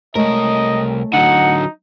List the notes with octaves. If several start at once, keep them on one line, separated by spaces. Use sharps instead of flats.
C2 G#3 A3 A#4 C#5 D#5
D3 F#3 D#4 F#5